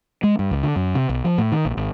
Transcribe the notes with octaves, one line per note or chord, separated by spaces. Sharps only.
G#3
G2
C#2
D3
F#2
C3
B1
F3
A2
D#3
A#1
G#1